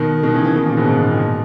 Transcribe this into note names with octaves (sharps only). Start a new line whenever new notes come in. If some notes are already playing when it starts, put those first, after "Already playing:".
Already playing: B2 D#3
B2 D#3
C#3 E3
C#3 E3
B2 D#3
A#2 C#3
G#2 B2
G#2 B2
A#2
B2